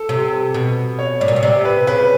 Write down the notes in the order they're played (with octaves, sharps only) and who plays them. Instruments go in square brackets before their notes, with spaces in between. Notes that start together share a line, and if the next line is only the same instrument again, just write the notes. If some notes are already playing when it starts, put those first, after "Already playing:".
Already playing: [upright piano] A4
[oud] C3
B2
[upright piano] C#5
[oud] A2 [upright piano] D5
[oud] A#2
B2
[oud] C3 [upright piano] D5
[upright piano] B4
[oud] C#3 [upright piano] B4